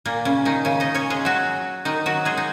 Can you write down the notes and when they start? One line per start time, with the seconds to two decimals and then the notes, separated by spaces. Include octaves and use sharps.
0.05 A#2 A#3
0.25 C#3 C#4
0.45 D#3 D#4
0.65 C#3 C#4
0.80 D#4 D#5
0.94 C#4 C#5
1.10 G#3 G#4
1.25 F#3 F#4
1.85 D#3 D#4
2.06 F#3 F#4
2.25 G#3 G#4
2.37 D#4